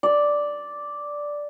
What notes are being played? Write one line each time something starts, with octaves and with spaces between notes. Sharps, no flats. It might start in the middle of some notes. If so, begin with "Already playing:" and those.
D5